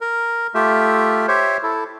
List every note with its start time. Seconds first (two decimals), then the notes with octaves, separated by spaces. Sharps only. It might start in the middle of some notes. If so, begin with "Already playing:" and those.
0.01 A#4
0.55 A3 F4 G4 E5
1.28 G4 C5 C#5 E5
1.63 E4 A4